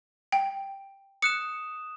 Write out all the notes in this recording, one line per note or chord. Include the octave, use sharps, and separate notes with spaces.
G5
D#6 F#6 C#7 E7